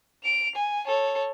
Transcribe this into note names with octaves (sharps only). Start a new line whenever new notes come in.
D7 F7
G#5
A4 C#5